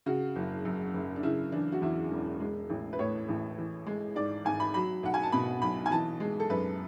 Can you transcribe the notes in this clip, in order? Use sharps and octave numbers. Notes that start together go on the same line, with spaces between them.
C#3 F#4
F#1
F#2
F#1
D4
C#3 E4
E3 D4
F#4
E2 E4
E1
G#3
A1
B4
A2 C#5
A1
E3
G#3
G#2 D5
G#1 G#5
B5
F#3 B5
B1 F#5
G#5
A5
B2 B5
B1 B5
G#5
E3 A5
G#3
A4
F#2 B4